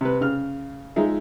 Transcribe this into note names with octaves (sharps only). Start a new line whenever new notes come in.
C3 B4
C#3 F6
F3 G#3 D#4 E5